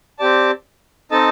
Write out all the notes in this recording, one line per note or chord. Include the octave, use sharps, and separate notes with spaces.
C4 G4 D5 A5
C4 D#4 A4 D#5 A5